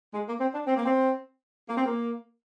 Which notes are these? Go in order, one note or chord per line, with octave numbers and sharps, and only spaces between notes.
G#3
A#3
C4
D4
C4
A#3
C4
A#3
C4
A#3